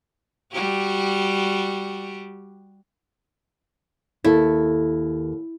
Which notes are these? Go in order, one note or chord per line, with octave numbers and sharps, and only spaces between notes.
G3 F#4 G4
D#2 E4 A4